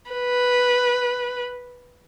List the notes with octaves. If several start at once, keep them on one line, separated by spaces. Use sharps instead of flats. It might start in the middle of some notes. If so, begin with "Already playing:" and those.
B4